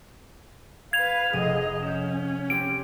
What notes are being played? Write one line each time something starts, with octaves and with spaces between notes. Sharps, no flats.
B4 F5 G#6 F7
F1 G#4 D#5 D#7
C#4 G6 E7
C4 G4 D7